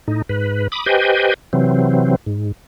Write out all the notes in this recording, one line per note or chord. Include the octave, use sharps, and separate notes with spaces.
A2 D#4
G#2 B4
B5 D6 D#6
G4 B4 C5 D#5 G5 G#5
C3 E3 F#3 C4
G#2